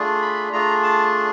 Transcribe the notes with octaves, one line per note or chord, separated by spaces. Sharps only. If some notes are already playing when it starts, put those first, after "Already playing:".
Already playing: A3 D4 F4 G#4
B5
A3 D4 F4 G#4 A#5
A5